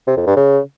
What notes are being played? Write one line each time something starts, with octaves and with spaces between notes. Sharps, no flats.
C3
F2
G2
C#3